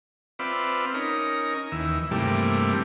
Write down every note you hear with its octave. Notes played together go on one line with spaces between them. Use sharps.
C4 F4 B4 D5 E5 B5
C#4 D#4 A#4
D#2 E3 E6
G2 C3 E3 G3 A3 A#3